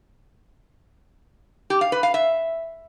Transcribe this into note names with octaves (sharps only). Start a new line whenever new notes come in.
G4
F5
B4
F5
E5